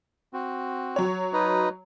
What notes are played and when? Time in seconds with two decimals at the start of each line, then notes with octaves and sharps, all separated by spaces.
0.33 C4 F#4
0.96 F#3 C#5
1.33 D#4 B4 D#5